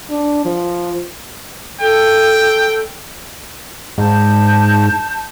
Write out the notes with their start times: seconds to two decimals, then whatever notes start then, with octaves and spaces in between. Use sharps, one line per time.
0.11 D4
0.45 F3
1.81 A4 G5
3.98 G#2 A5 G6